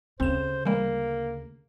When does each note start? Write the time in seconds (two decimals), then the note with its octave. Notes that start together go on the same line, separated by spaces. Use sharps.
0.20 D2 C#3 C4 C5 E7
0.65 E3 G3 G#3 A#3